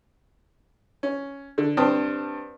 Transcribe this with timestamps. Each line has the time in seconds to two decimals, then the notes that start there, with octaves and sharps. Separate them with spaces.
1.03 C#4
1.58 D3
1.77 G2 C4 C5 G5 A5 D#6